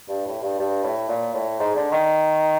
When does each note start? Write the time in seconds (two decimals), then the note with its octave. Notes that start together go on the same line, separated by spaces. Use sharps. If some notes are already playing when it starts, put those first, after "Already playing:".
0.08 G2
0.26 A2
0.42 G2
0.59 G2
0.84 A2
1.08 A#2
1.34 A2
1.59 G#2
1.75 D3
1.91 D#3